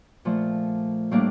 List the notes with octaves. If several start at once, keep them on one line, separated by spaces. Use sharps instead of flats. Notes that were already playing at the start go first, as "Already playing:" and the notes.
A#2 F3 A3
A2 G3 A#3 D4